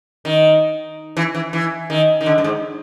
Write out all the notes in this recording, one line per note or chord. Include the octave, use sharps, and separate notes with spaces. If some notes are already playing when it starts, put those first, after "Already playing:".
D#3
E3
E3
E3
D#3
D#3
D3
G2
G#2